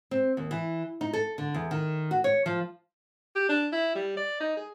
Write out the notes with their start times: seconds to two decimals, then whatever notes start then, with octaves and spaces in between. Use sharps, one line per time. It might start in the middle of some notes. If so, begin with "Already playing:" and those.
0.11 C4
0.37 D#2
0.51 E3
1.01 D#4
1.13 A4
1.38 D3
1.54 E2
1.71 D#3
2.11 F#4
2.24 C#5
2.46 F3
3.36 G4
3.49 D4
3.73 E4
3.96 G3
4.17 D5
4.40 D#4
4.57 G#4